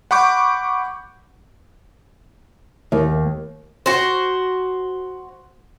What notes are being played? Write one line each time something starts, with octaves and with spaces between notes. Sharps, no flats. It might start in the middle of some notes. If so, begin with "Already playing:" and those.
F#5 B5 C#6 D6 G6
D#2
F#4 C5